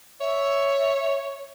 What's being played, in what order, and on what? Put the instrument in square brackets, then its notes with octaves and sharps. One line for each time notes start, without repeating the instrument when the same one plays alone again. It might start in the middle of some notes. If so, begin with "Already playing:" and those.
[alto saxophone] C#5 [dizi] E5